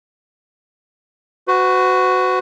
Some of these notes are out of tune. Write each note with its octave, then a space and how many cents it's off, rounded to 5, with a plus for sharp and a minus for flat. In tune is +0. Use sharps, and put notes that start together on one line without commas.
F#4 +0 B4 +45